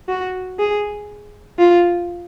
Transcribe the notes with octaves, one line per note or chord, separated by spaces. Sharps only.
F#4
G#4
F4